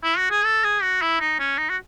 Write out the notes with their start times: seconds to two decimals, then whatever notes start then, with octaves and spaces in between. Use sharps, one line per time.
0.04 E4
0.18 F#4
0.31 G#4
0.45 A4
0.64 G#4
0.82 F#4
1.02 E4
1.21 D#4
1.39 C#4
1.58 D#4
1.69 F#4